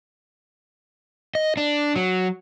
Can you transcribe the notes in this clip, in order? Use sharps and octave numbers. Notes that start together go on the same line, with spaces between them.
D#5
D4
F#3